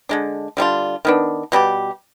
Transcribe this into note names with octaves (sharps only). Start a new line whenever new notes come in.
D3 G#3 D4
D3 G3 D4 F4
D#3 B3 D4
B2 G3 D4 G4